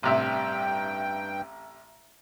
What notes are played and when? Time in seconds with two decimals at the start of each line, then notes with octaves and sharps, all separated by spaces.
0.03 A1 G2 C3 E5 G5